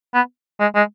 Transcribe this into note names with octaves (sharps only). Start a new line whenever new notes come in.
B3
G#3
G#3